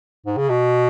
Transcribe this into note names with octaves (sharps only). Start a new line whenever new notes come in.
G#2
C#3
B2